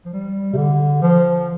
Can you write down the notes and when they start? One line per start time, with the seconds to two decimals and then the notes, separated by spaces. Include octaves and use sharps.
0.05 F3
0.13 G3
0.53 C3
0.57 D3
1.02 F3